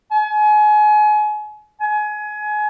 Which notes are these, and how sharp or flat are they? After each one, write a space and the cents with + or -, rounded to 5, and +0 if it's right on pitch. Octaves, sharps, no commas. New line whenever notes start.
G#5 +30
G#5 +25